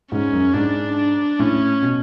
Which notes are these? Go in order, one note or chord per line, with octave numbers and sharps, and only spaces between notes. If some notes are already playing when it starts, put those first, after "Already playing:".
G#2 C#4
F#2
G#2 D4
D4
A2 C#4
B2